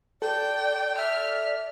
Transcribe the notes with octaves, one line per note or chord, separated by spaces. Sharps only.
A4 D5 G5
D5 E5 F6